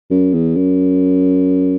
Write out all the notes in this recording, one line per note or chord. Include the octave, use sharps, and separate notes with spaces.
F#2
E2
F#2